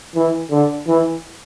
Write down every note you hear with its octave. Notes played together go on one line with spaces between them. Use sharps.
E3
D3
E3